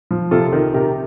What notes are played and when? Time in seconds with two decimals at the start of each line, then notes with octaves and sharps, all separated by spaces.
0.11 F3
0.31 C3 F4 A4
0.53 D#3
0.74 C3 G4 A#4